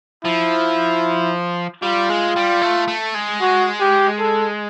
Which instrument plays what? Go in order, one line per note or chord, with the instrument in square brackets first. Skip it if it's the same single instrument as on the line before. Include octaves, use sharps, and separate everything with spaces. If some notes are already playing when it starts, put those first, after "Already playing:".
[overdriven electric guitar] F3 [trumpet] E4
[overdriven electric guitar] G3 [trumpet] F4
[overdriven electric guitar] G#3
G3
A3
A3
G#3
[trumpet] F#4
G4
A4